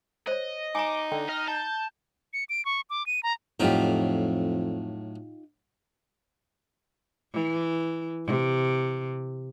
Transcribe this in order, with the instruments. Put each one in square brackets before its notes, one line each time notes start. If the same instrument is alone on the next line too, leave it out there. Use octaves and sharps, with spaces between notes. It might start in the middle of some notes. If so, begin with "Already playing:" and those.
[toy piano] C5 C#5 [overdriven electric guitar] D#5
[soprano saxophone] D#4 [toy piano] G#5 A#5 [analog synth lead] D6
[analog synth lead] D3 [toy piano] G5
[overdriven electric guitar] D#5 [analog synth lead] F6
[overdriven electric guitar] A5 [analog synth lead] G6
[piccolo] C#7
D7
C#6
D6
D#7
A#5
[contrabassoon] F2 [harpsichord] A2 F#3 A#4 [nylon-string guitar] D#4 F4 G4
[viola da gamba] E3
C3